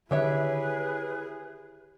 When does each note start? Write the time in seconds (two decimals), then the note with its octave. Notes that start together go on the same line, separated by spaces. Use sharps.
0.11 D3 D#3 E4 G4 G#4 B4 C#5 E5